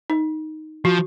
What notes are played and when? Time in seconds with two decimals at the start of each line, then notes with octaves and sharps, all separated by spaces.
0.10 D#4
0.85 F3 F#4